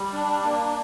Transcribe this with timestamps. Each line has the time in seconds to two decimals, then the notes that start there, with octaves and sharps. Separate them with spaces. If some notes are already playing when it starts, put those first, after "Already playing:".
Already playing: G3
0.13 D4
0.44 A#3